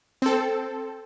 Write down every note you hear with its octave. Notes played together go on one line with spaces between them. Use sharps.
C4 A4